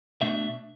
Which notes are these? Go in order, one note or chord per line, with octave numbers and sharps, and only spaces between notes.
B2 A3 D4 E5